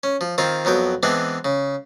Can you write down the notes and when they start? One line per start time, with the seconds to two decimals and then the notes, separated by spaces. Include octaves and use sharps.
0.03 C#4
0.21 F3
0.38 D#3 C4 F4 C5
0.65 F2 F#3 B3 G5
1.03 E3 G#3 B3 C4 D4
1.44 C#3